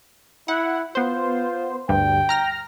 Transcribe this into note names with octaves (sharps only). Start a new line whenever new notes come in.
E4 F#5
B3 F4 C5
D2 G2 G5
A#5 F6 A#6